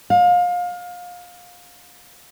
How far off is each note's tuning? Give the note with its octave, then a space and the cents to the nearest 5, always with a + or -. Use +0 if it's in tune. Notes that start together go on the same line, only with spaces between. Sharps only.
F5 +25